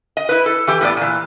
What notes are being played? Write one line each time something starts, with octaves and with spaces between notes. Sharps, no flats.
D#5
E4 B4
A4
E3 G4
A2 B3 D5
A#2 E3